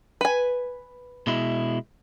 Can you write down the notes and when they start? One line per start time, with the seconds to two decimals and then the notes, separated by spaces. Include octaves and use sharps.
0.21 B4 G#5
1.27 B2 G#3 E4